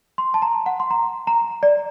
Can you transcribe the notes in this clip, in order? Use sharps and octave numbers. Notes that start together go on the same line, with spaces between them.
C6
A5
A#5
F#5
C6
A#5
A#5
D5